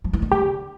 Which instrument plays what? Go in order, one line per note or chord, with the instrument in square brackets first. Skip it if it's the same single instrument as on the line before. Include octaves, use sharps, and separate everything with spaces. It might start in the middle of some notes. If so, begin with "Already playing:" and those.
[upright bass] F3
E3
D#3
[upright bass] D3 [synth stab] G4